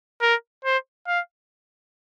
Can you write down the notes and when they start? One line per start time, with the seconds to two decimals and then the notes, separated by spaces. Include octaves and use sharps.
0.22 A#4
0.65 C5
1.07 F5